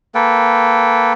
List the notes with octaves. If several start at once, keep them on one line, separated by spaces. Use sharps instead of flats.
A#3 A4 B4 G5